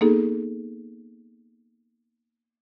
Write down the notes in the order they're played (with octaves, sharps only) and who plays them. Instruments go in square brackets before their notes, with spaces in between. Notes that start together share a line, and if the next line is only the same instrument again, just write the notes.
[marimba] A#3 B3 D#4 G#4 A4